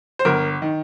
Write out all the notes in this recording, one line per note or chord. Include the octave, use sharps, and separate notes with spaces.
C5
G1 A#4
D#3